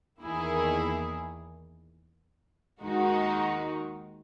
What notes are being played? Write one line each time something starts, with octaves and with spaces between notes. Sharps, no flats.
E2 D#3 A#3 E4 G#4
D#2 D#3 G#3 D#4 F#4